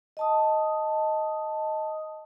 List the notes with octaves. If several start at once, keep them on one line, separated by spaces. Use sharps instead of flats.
D#5 A5 D#6